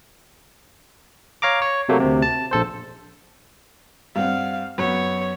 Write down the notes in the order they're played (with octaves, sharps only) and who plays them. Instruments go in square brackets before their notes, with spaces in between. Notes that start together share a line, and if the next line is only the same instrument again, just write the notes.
[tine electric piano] C#5 F5 A#5 D6
C#5
C3 F#3 A3 A#3
D2 C3
A5
A#1 A4 C5
[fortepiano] G2 C4 F#5 [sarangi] F5
[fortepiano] F#2 B3 [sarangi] C#5